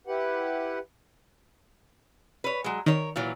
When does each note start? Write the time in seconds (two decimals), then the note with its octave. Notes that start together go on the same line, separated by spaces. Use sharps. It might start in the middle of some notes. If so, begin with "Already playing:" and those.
0.07 E4 G4 B4 F#5
2.44 B4 C#5
2.64 F#3 G#3
2.86 D#3 A#4 C#5
3.16 A#2 E3 F#3